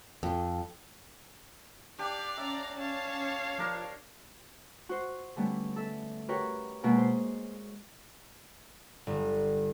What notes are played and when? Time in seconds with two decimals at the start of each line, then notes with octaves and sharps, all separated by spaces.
0.23 F2
1.98 D4 G4 D5 F5
2.37 C#4 E5 A#5
2.78 C#5 F5 A5
3.58 F3 D4 A#4
4.89 F#4 C5
5.36 D3 G3 A3 B3 C#4 D4
5.76 A4 E5
6.28 F#4 G4 A#4 B4 C#5 G5
6.83 B2 G#3 A#3 G#4
6.98 C5
9.07 G1